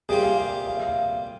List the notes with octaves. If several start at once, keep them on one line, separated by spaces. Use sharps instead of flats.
C3 G3 A#3 F4 G#4
F5
F5
F5
E5
F5